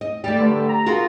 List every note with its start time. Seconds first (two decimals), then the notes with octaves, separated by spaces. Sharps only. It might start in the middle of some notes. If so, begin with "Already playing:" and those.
0.01 D#5
0.24 G3 A3 G4 D5
0.39 G2 D3
0.69 A#5
0.86 F4 F#4 G#4 A#4